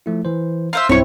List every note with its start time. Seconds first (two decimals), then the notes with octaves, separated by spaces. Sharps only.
0.06 F3 A3 E4
0.25 E3 C5
0.73 F4 C5 E5
0.89 B1 G2 B2 C4 E4 C#5 C#6